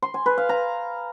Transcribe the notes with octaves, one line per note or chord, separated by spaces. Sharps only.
C6
G#5
B4
F5
A#5